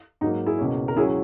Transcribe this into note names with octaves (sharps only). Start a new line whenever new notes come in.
G#2 F#3 A#3 D#4
E4 G#4
C#2 B2 A#3 C#4
A#4
C#2 C#3 F#3 C#4 E4 G#4